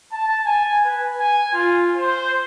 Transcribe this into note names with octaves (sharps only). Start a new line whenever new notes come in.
A5
G#5
B4
G#5
F4
C5